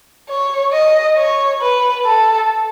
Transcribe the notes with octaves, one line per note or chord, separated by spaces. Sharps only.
C#5
D#5
C#5
B4
A4